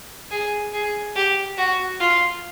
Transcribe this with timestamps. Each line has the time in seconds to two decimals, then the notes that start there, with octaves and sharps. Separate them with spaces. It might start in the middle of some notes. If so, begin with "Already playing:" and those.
0.31 G#4
0.73 G#4
1.16 G4
1.58 F#4
2.00 F4